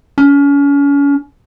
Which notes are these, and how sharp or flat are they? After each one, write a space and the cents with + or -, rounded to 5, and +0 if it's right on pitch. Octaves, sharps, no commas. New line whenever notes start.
C#4 +35